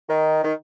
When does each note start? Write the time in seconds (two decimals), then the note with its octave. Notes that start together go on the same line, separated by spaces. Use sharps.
0.09 D#3
0.43 D#3